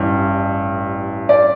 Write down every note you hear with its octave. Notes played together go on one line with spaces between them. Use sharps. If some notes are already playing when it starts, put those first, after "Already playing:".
Already playing: A1 G2 E3
D5